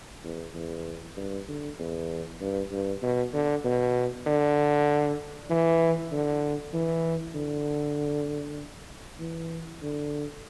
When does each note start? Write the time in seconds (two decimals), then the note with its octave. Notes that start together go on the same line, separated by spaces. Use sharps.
0.24 E2
0.55 E2
1.17 G2
1.48 D3
1.79 E2
2.41 G2
2.72 G2
3.03 B2
3.34 D3
3.65 B2
4.27 D3
5.50 E3
6.12 D3
6.73 E3
7.35 D3
9.20 E3
9.82 D3